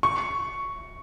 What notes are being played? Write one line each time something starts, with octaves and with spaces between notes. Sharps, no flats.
C#6